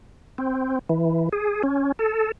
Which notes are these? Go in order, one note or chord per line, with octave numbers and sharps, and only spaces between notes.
C4
E3
G#4
C#4
A4